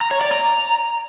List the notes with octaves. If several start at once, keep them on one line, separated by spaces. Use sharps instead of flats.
A#5
C#5
D5
A#5